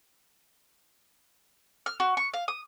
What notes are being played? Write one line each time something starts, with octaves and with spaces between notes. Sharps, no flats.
F6
F#4
C#6
F5
D#6